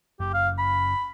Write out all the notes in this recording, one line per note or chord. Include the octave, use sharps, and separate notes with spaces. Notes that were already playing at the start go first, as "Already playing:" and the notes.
F#1 G4
F5
B5